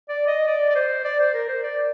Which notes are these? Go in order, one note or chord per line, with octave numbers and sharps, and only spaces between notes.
D5
D#5
D5
D5
C5
D5
C5
A#4
C5
D5